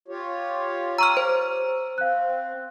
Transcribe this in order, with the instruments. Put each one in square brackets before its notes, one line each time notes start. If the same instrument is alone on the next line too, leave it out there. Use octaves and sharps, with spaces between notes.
[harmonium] F4 G4 C#5
[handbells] A#5 C#6 F6 [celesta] E6 D#7
[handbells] C5
[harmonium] C4 [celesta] F5 F#6